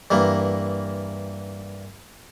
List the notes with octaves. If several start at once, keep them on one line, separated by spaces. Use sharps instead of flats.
G2 E3 A#3